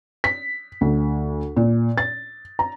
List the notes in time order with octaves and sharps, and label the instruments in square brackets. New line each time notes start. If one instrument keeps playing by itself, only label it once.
[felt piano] B6
D2
A#2
A6
A#5